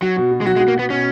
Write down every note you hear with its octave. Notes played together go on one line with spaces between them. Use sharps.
F#3 F#4
B2
B2
G#3
F#3 F#4
G#3
F#4
A#3
B3 F#4
B2 C#4